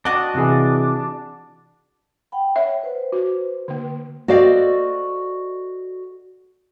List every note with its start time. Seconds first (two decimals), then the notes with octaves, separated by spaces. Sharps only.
0.05 D4 F#4 D#5
0.35 C3 E3 G#4
2.32 F#5 G5 B5
2.56 C#5 E5
2.83 B4 C5
3.12 F#4
3.68 D3 A#3
4.28 F#4 A4 C5 D5 D#5 F5